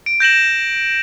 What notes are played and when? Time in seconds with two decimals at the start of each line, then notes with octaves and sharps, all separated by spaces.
0.06 D7
0.20 G6 A#6 E7 F#7